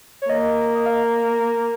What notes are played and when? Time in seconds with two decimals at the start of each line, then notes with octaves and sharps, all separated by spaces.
0.22 C#5
0.30 A#3 D#5
0.75 D#5
0.86 F5